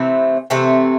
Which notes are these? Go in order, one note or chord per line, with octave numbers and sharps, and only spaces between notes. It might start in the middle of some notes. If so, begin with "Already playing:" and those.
Already playing: C3 E3 A3 C4
C3 E3 A3 C4